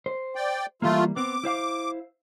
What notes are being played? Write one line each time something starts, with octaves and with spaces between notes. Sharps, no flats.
C5
D5 G5
E3 G3 A3 A#3 F4
B3 C4 D6
E4 C5 F5